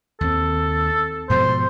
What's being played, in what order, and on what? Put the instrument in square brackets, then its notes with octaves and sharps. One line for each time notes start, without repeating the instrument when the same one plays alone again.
[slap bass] D#2 C4 [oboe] A4
[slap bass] G#2 B2 F3 [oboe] C5